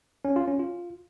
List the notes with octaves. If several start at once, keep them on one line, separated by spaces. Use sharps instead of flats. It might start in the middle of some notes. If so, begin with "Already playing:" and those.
C#4
F4
C#4
F4